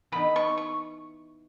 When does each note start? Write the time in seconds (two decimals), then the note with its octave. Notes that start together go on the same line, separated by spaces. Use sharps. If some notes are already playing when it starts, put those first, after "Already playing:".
0.12 E3 B3 D#4 B5
0.36 C#6
0.57 C#6